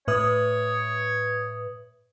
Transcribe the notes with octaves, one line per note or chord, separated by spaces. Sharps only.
A2 B4 C#5 D#6